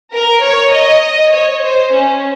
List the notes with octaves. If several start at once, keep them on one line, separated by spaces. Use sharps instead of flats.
A#4
C#5
D#5
C#5
C5
C#4